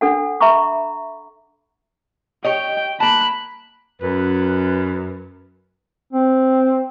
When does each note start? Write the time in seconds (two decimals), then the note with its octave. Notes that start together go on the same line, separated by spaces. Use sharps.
0.01 D4 A4 F#5
0.41 E5 A#5 B5 C#6 D6
2.45 G4 C#5 D#5 G5
3.00 A#3 A5 B5 F#6
4.01 F#2 B4
6.13 C4